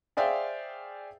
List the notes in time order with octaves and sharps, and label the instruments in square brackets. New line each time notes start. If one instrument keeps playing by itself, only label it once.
[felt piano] G#4 C5 D5 E5 F5 G5